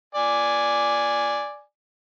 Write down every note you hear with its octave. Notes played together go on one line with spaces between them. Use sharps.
D5 G#5